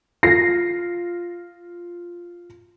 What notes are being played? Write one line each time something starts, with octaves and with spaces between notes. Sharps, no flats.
F4 A#6 C7